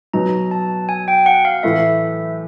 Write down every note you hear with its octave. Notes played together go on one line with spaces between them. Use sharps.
B2 F#3 B3 D#4 A#5
A5
G#5
G5
F#5
F5
A2 E3 A3 E5